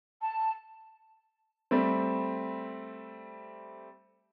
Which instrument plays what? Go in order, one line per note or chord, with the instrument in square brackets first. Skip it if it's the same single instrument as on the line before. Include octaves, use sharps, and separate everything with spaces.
[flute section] A5
[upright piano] G3 A3 C4